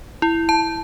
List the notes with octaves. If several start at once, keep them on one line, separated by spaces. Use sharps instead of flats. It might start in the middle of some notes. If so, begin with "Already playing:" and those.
E4
A5